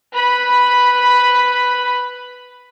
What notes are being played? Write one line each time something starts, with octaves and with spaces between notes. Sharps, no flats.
B4 B5